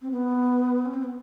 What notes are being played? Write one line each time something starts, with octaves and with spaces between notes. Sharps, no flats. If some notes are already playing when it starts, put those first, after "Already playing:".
C4
B3
C#4
C4
B3